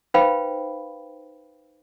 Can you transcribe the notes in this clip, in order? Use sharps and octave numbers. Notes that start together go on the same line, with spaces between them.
D#4 B4 C5 F5 G5 B5